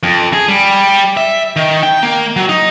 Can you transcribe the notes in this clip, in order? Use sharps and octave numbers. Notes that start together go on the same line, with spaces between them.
F2
G#4
G3
E5
D#3
G5
A#3
F#3
D#4